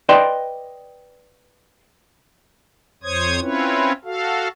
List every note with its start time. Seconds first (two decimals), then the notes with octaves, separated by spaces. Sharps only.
0.09 B4 D5 D#5 G5 A5 C6
3.03 F2 C5 C#5 D#6 G#6
3.41 C4 C#4 E4 F4 B4 C#5
4.05 F#4 A4 F5